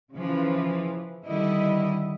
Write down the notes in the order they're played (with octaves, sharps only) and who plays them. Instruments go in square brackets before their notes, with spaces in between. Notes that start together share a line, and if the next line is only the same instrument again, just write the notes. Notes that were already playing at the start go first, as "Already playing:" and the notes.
[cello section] C#3 E3 F3
D3 D#3 G3 E4 D#5